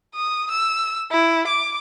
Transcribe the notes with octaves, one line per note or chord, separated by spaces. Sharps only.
D#6
E6
E4
D6